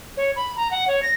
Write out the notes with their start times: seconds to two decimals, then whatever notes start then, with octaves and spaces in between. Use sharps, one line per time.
0.17 C#5
0.36 B5
0.57 A#5
0.71 F#5
0.88 C#5
1.03 A#6